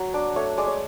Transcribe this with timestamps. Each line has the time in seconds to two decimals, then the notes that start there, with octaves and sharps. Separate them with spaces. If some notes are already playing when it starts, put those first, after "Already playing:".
Already playing: F#3
0.14 D4 D5
0.36 A3 C#5
0.58 G#3 D5
0.67 C#5